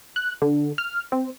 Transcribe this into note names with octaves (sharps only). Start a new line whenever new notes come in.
F#6
D3
F6
C4